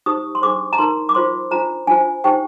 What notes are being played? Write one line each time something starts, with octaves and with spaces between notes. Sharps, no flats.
D#4 G4 C5 D#6
C6
D4 G#4 C5 D6
A#5
D#4 A#4 C6
D6
F4 C5 C6
D4 F4 C5 A#5
D4 F4 C5 G#5
D#4 G4 C5 G5